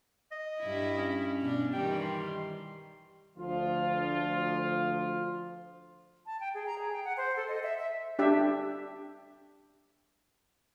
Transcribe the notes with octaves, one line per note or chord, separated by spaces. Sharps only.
D#5
G2 E4
C#4
B2 D4
D#3 E3 G3 G5
C6
D2 F3 F4
A5
G5
G#4
A#5
G#4
G5
F#5
C5
A4
D#5
E5
E5
D4 G4 E5